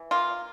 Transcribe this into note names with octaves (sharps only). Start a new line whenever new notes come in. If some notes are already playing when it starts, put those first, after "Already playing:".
Already playing: E3
A#3 F4